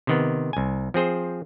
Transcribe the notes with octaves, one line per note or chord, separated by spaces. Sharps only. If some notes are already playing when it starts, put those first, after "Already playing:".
C3 D#3 B3
C2 G#5
F3 C4 G#4 C5